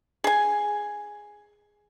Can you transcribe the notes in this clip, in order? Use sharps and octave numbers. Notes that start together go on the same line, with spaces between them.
G#4 G#5